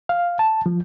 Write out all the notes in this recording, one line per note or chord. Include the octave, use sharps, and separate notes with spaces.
F5
A5
F3